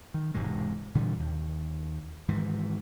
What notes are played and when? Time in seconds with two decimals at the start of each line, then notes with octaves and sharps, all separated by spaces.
0.14 D#3
0.34 E1 G#2 C3 G#3
0.95 A#2 D3 E3 G3
1.20 D#2
2.28 G#2 D#3 E3